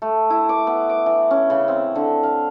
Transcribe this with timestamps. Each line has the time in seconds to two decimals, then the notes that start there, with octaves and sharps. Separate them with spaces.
0.02 A3
0.30 E4
0.49 D6
0.67 B3
0.89 D6
1.06 E3
1.31 C#4
1.50 C#3
1.68 C4
1.95 D3
2.23 F5